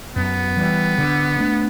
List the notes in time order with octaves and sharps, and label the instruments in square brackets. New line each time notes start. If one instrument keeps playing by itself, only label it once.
[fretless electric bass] F#2 [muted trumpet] B3
[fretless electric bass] E3 G3
D3
A3 D4